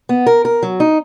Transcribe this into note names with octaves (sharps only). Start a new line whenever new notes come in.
B3
A#4
A#4
F#3
D#4